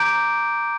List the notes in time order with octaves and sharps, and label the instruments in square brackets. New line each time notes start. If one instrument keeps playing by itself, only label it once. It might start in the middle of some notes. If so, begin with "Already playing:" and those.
Already playing: [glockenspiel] A#5 D6 G6 D7